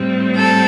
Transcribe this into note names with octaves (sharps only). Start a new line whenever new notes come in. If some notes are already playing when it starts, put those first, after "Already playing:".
Already playing: A2 G3 C4
A4